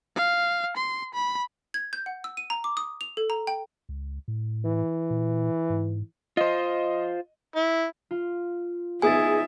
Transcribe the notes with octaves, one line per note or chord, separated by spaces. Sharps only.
F5
C6
B5
G#6
G6
F#5
E6
D#7
A#5
D6
D#6
F7
A4
A#5
G5
C#2
A2
E3
A#2
G#2
F4 C5 D#5
E4
F4
B3 D#4 G#4 E5 G#5 D#6 A6